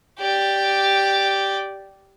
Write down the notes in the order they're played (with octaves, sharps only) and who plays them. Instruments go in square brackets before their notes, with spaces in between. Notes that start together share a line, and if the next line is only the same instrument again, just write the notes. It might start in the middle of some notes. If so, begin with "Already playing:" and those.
[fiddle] G4 D5